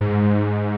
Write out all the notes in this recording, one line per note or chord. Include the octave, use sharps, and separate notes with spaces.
G#2